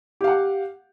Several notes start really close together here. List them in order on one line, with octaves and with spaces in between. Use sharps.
G4 F5 F#5